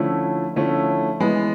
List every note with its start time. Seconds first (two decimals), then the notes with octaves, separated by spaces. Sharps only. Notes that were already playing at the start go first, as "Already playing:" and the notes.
Already playing: D3 F3 A3 C#4 E4
0.56 D3 F3 A3 C#4 E4
1.20 E3 G#3 B3